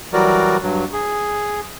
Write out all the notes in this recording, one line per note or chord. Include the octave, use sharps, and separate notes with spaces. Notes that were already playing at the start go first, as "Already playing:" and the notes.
E3 F#3 G3 F#4 A#4 D5
G2 F#3
G#4